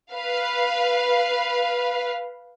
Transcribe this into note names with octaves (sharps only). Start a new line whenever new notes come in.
B4 F5